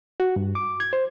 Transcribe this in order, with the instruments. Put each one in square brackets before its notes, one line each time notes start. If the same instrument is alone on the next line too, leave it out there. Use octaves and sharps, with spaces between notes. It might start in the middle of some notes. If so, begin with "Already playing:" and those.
[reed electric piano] F#4
G2
D6
G#6
C5